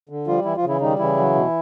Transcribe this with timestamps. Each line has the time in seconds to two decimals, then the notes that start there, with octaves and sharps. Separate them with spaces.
0.09 D3
0.27 F3 G3 F4
0.45 E3 E4
0.57 F3 F4
0.63 C#3
0.69 E3 E4
0.81 D#3 G3 D#4
0.99 C#3 E3 E4
1.17 F#3
1.34 B2